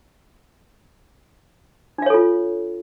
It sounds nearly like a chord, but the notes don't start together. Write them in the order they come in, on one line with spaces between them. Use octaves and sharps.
D4 F5 C#5 A4 F4